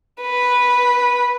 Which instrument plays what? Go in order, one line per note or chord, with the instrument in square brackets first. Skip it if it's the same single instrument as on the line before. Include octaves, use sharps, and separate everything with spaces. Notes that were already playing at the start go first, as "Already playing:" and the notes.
[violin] B4